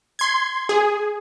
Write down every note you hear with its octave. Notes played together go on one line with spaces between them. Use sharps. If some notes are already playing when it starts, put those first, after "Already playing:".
C6 G#6
G#4